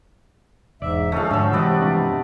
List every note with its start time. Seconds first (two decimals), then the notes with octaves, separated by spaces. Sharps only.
0.82 E1 G#2 D5 E5
1.12 D3 F3 G#3 A3 C#4 A4 F5
1.31 G#2 D3 F#3 E5
1.53 C3 E3 F#3 G#3 C4 B4 D5 D#5
1.81 G2 B2 F3